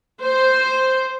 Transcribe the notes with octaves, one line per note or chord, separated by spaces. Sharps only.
C5